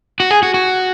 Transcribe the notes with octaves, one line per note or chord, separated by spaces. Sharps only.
F#4
G#4
F#4
F#4